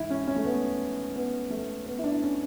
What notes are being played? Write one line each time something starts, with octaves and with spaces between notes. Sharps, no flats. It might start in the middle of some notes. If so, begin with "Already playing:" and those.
Already playing: G#2 E3 E4
C#4
C#4
A3
B3
B3
A3
B3
E4
D4
C#4